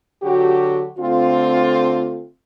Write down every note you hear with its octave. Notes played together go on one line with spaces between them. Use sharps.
D3 F#3 F#4 G4
D3 A3 C4 F4